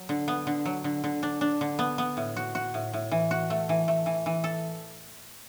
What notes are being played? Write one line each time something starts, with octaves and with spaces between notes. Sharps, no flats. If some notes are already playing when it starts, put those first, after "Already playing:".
Already playing: F#3
D3
B3
D3
F#3
D3
D3
D4
D4
D3
B3
B3
A2
F#4
F#4
A2
A2
E3
F#4
A3
E3
A3
E3
E3
A4